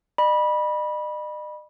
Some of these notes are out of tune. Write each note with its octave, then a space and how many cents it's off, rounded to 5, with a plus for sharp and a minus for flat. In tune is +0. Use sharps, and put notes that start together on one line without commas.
D#5 -45 B5 -20